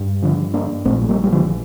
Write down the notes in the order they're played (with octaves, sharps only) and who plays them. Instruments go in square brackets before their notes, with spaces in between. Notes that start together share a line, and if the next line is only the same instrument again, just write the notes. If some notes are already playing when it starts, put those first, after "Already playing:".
Already playing: [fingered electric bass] G2
D3 F3
A#3 D4
A#1 A#2 A3 C4
A3
G3 A#3
G3
D3 F3